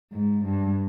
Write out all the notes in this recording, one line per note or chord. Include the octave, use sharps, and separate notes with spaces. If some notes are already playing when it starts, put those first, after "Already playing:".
G#2
G2